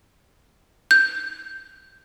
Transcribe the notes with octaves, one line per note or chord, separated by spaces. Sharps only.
G6